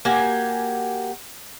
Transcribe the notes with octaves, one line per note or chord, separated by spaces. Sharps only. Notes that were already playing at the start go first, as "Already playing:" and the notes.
A#3 F#4 G4 G#5